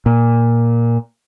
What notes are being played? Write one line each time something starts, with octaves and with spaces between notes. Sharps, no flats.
A#2